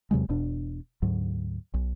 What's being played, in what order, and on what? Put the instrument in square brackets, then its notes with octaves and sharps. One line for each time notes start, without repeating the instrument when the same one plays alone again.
[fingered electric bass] E2 C3 F#3 G#3
E1 E2 B2 D4
D2 G#2 F#3
B1